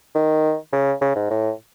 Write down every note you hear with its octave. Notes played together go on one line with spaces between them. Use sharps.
D#3
C#3
C#3
G#2
A2